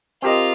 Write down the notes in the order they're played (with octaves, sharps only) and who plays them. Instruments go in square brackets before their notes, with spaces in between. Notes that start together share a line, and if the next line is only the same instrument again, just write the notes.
[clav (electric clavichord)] C4 G4 A#4 D#5 [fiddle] F4